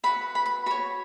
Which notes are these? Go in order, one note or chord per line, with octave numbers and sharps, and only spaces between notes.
F#4 B4 B5
B5
B5
F#4 C#5 B5